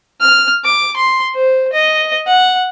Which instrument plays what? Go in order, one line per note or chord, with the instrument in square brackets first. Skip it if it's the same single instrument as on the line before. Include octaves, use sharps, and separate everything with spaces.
[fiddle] F6
D6
C6
C5
D#5
F#5